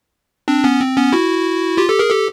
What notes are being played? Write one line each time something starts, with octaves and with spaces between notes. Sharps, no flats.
C4 D4
B3 C#4
C4
B3 C#4
E4 F#4
F4 G4
G4 A4
G#4 A#4
G4 A4